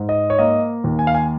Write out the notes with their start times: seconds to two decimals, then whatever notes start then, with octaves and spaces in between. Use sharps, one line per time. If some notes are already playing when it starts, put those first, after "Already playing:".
Already playing: G#2
0.09 D#5
0.30 C#5
0.39 A#3 D#5
0.84 D#2
0.99 G#5
1.07 F5
1.15 G#5